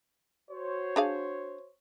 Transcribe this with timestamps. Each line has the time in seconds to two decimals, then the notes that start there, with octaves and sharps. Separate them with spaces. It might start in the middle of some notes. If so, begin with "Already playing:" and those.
0.51 F#4 C5 C#5
0.96 D4 G#4 F5